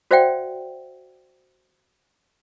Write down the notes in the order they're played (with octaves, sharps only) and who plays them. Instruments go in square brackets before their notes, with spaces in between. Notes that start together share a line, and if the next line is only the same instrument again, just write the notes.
[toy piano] F#4 C5 D5 E5 F#5 G5